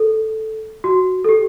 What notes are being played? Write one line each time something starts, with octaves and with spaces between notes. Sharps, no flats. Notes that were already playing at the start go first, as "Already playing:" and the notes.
Already playing: A4
F#4
A4
G4